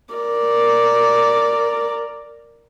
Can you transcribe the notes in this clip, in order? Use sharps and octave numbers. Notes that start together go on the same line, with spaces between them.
A#4 D5